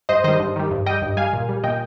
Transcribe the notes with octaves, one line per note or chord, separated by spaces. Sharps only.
G2 C5 D#5
D#3 G3 C5 D#5
G2
D#3 G3
G2
G3 D#5 G5
G2
G3 F5 G#5
A#2
G3
A#2 D#5 G5